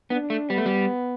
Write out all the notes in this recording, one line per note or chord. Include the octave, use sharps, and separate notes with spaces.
B3 D4
A3
G3 B3
A3
G3